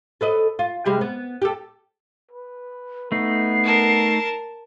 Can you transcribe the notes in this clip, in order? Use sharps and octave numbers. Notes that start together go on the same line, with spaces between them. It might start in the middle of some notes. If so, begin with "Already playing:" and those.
A4 B4 D#5
F4
C3 G3 G#3
B3
G4 A4
B4
A3 B3 D#4 C7
A#4 A5